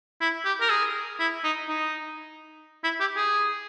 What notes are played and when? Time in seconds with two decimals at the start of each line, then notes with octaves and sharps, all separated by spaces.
0.21 E4
0.45 G4
0.61 A#4
0.70 G#4
1.19 E4
1.44 D#4
1.68 D#4
2.84 E4
3.00 G4
3.16 G#4